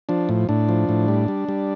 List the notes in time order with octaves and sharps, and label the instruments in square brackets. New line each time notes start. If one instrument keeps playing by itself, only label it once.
[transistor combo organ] F3 D4
A2
A2 D4
F3
A2
G3
G3
G3